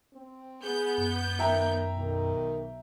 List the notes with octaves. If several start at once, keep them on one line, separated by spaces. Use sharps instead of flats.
C4
B3 G#4 G6
F#2
D#3 E5 G5 A#5
B1 D#3